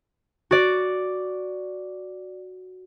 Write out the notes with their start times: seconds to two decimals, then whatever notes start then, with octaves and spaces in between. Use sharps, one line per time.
0.51 F#4 D5